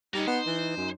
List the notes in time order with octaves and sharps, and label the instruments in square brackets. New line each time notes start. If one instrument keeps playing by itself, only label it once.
[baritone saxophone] G3 [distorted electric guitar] A#3 C#4 [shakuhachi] D#4
[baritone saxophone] B3 [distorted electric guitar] C5
[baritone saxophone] E3
F#2